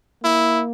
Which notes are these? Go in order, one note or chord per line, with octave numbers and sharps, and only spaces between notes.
A#3 E4